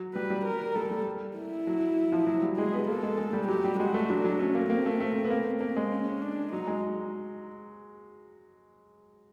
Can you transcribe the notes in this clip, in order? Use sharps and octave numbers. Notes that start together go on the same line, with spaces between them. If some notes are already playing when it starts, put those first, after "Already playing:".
Already playing: F#3
G3 B4
G3
A#4
G3 A4
G3
E4
F#3
F3
F#3
G3
G#3 G#4
B3
A#3 A4
G#3
G#3
G3
F#3 G4
G3
G#3 F#4
A3
F#3 D4
F#3
A3 C#4
A#3
A#3 C4
A3
A3
B3
A#3
A#3 C4
G#3
C#4
D4
F#3 D#4
G#3